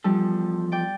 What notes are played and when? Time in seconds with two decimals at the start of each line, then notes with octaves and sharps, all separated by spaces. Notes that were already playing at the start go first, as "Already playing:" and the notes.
0.04 E2 F3 G3 A4
0.72 D5 G5 D6